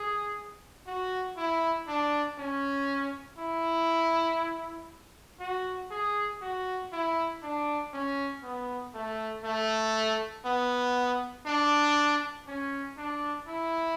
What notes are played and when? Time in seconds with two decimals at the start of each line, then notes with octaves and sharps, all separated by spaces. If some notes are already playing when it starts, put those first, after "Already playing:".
Already playing: G#4
0.87 F#4
1.37 E4
1.88 D4
2.38 C#4
3.38 E4
5.40 F#4
5.91 G#4
6.41 F#4
6.92 E4
7.43 D4
7.93 C#4
8.43 B3
8.94 A3
9.44 A3
10.45 B3
11.46 D4
12.47 C#4
12.97 D4
13.48 E4